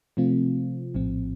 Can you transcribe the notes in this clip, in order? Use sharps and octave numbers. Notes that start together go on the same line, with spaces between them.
C3 F3 A3 C4 F4
A#1 A2 F3 C4